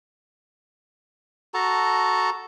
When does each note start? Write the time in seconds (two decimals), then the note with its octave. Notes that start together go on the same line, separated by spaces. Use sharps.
1.54 F#4 A4 A5 A#5